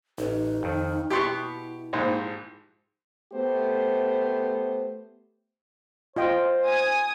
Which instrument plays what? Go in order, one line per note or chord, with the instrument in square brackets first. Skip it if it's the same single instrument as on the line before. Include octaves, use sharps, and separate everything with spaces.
[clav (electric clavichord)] A1 [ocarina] D#4
[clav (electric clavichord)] F2 D#3
[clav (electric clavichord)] B2 B3 [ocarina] E4 [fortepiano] G4 C6 C#6
[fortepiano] A#1 G#2 C5 [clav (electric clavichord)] G4
[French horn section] A3 B3 G4 C5
[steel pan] F4 D#5 G5 [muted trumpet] C5
[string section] G#5 D#6